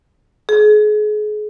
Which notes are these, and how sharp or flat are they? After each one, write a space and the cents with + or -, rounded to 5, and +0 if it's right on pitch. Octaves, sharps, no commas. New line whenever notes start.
G#4 +35